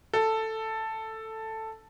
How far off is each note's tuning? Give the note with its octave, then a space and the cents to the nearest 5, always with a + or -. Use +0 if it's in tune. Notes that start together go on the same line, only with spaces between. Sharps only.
A4 +5